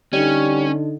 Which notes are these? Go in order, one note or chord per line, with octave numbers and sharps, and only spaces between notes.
D3 G3 C#4 D#4 D#5